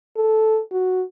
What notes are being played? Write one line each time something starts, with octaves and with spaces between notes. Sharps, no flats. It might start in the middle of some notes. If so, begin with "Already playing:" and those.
A4
F#4